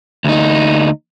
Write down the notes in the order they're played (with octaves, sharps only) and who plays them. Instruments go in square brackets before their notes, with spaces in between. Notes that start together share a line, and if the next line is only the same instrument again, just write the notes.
[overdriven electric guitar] D2 D#4